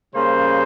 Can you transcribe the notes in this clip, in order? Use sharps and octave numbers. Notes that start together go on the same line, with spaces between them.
C#3 G3 A#3 C#4 C5